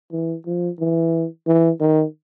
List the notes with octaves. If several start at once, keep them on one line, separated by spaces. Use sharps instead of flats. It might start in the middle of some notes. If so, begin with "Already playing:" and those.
E3
F3
E3
E3
D#3